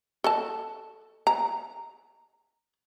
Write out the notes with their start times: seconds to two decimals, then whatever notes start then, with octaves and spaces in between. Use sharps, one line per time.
0.24 A4 D#5 A5
1.27 A#5